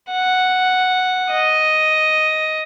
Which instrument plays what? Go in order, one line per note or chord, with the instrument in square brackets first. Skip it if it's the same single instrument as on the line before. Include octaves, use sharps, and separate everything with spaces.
[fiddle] F#5
D#5